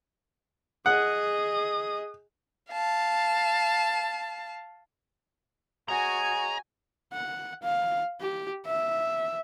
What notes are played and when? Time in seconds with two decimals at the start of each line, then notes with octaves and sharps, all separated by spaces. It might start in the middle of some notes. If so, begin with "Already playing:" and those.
0.86 G#4 D#5 F#5 D#6
2.71 F5 A5
5.88 F#4 G#4 C#5 D#5 G#5 A#5
7.13 F#5
7.63 F5
8.20 G4
8.66 E5